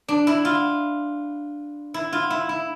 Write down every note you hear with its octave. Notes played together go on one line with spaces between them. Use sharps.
D4
E4
F4
E4
F4
E4
E4